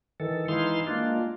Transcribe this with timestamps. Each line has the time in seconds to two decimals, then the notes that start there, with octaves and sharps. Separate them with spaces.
0.20 D#3 E3 A4
0.48 E3 G#3 D#4 E4 F5 C6
0.87 G#3 A#3 D4 F4